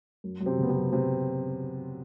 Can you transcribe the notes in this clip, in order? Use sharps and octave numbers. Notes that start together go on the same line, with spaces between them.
F#2
F#2
C3 C4
C#3
B3
C3 C4
F#2
F#2 C3 C4